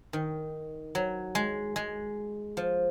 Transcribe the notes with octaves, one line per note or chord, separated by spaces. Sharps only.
D#3
F#3
G#3
G#3
F3